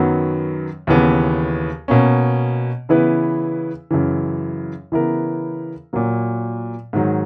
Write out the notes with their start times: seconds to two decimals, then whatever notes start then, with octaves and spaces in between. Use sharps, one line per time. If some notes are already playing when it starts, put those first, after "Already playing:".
Already playing: F#2 D#3 F#3 B3
0.87 D#2 C#3 E3 B3
1.88 B2 A#3 C#4
2.89 C#3 E3 B3 E4 B4
3.91 F#2 C#3 E3
4.92 C#3 E3 B3 E4 A#4
5.93 A#2 F#3 A#3
6.93 G#2 D#3 F#3